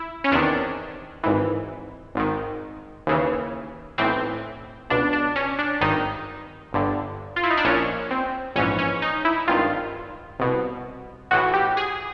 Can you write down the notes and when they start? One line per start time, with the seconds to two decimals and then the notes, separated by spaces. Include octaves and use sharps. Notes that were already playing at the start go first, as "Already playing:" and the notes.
Already playing: E4
0.24 C#4
0.32 E2 C3 D#3 D4
1.24 G#1 G#2 E3
2.15 G#1 G#2 D#3
3.07 D#2 C#3 E3
3.98 B1 A2 E3 C4
4.90 C#2 B2 D4
5.13 D4
5.36 C#4
5.58 D4
5.81 G#1 G2 D#3 D#4
6.73 G1 G2 D3
7.36 F4
7.43 E4
7.50 D#4
7.57 D4
7.64 A#1 A#2 C#4
8.11 C4
8.56 A#1 G#2 E3 C#4
8.79 C#4
9.02 D#4
9.25 E4
9.48 G#1 G2 D#3 F4
10.39 C2 B2
11.31 B1 A2 E3 F#4
11.54 G4
11.77 G#4